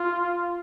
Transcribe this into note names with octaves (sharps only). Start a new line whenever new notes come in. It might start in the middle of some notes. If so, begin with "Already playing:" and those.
Already playing: F4